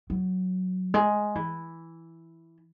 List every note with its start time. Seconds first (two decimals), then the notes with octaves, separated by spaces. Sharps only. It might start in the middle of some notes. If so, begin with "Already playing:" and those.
0.10 F#3
0.94 G#3
1.35 E3